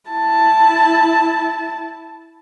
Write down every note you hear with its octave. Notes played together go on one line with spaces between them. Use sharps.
E4 A5